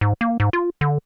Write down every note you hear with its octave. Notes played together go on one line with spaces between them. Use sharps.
G#2
A#3
G#2
F4
D3